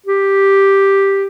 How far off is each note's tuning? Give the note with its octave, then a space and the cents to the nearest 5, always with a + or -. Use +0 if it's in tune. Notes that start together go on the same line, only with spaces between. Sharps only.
G4 +0